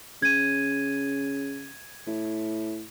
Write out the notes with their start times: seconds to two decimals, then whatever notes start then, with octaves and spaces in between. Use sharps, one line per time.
0.22 C#3 G#6 D#7
2.07 A2